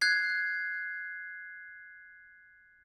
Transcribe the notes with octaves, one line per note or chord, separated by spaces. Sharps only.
F#6 G#6 C7